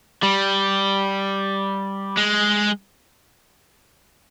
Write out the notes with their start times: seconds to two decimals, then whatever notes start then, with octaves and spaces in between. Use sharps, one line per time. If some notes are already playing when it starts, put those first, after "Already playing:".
0.23 G3
2.18 G#3